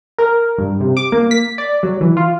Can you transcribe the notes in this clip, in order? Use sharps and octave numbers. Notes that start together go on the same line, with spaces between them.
A#4
G2
C3
D6
A#3
B6
D5
F#3
E3
F4